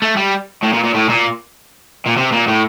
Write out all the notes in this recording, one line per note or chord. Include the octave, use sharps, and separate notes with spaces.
A3
G3
A2
A#2
A#2
A2
A#2
A#2
C3
A#2
A2